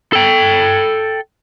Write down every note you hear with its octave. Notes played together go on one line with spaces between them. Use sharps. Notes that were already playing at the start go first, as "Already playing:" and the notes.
A4 G5